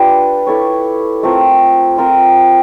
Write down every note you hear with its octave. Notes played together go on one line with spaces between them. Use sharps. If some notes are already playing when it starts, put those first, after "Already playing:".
Already playing: D4 F4 G4 B4
E4 A4 C#5
A3 C4 F4 A#4
C4 F4 A#4